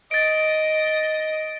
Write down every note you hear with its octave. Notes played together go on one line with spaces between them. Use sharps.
D#5 A6 D7